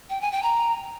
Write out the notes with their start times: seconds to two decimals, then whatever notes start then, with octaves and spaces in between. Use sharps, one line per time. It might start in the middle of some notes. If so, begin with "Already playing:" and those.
0.10 G5
0.21 G#5
0.32 G5
0.43 A#5